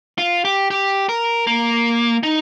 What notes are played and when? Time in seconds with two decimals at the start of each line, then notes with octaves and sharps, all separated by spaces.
0.18 F4
0.45 G4
0.71 G4
1.09 A#4
1.47 A#3
2.23 D#4